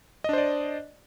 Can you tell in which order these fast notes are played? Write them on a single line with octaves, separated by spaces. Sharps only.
D#5 D4 C5 D5